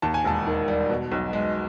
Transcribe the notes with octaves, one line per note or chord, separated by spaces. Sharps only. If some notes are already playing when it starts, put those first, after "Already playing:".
D#2 A5
G#5
E1 A5
D#3
G3
B2
B1
G#3